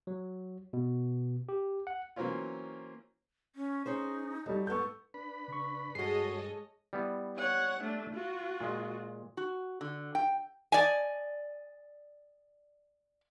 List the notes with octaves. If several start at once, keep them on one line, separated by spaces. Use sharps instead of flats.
F#3
B2
G4
F#5
E3 F#3 A#3 C4 C#4 F4
C#4
C#4 D#4 G#4 C5
F#3 G3 A4 D#5
G#2 B3 A4 C#6 G6
D4 B4 B5
C#3 C#6
G2 G#3 F#4 G#4 A4 C#5 D#5 C7
G3 B3 E4
C#5 F#5
A3 D4
F4 F#4
A#2 G#3
F#4
D3
G5
D5 D#5 G#5